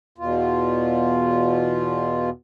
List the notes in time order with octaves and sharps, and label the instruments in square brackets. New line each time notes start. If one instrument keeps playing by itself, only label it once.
[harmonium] E2 B2 F4